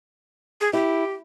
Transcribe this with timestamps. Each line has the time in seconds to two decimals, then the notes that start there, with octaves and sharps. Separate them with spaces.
0.61 G#4
0.73 E4 G4